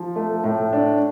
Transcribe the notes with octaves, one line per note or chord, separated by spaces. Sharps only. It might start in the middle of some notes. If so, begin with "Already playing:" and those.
Already playing: F3
A3
A2
D4